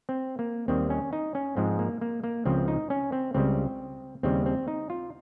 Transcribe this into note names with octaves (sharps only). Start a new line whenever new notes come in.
C4
A#3
D#2 D#3 G3 C4
C#4
D#4
C#4
G#2 F3 G#3 C4
A#3
A#3
A#3
C#2 C#3 F3 C4
D#4
C#4
C4
C#2 C#3 G3 C4
D#2 C#3 G3 C4
C4
D#4
F4